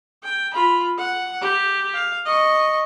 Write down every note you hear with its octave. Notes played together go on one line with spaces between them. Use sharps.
G5
F4 B5
F#5
G4
F5
D#5 C#6